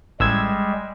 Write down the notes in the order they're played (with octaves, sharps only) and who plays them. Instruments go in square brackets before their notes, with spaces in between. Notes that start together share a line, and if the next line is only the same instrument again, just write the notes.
[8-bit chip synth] A1 E6 G#6 [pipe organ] G3 G#3